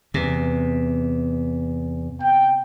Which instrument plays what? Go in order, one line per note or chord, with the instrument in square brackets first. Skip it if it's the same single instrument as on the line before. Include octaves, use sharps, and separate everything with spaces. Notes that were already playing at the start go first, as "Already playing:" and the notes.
[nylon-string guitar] E2 [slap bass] C3
[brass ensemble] G5